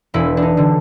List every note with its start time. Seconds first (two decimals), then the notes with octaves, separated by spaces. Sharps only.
0.14 E1 E4
0.37 D4
0.42 D#4
0.57 D3 G3